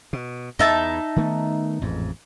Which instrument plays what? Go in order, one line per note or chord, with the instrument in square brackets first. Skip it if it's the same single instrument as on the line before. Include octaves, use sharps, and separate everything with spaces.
[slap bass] B2
[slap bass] E2 [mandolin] D#4 E5 A5
[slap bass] D#3 A3 B3
A1 F2 G#2